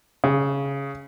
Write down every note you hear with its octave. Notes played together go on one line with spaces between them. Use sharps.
C#3